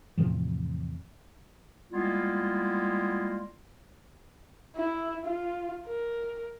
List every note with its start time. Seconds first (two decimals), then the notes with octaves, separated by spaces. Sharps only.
0.18 E2 A2 C3 F3
1.91 G3 G#3 A#3 B3 E4 F4
4.76 E4
5.25 F4
5.86 A#4